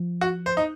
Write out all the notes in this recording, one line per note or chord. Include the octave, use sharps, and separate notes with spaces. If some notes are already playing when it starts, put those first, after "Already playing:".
Already playing: F3
F#4
C5
D#4